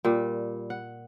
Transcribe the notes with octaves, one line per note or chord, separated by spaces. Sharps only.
A#2 G3
F#5